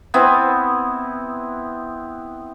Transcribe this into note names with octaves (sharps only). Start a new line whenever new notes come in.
B3 C4 E4